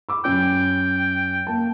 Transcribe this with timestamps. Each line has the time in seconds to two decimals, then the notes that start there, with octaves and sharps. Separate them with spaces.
0.09 B5 D6 E6
0.25 F#2 C#4 G5
1.47 A#3 A5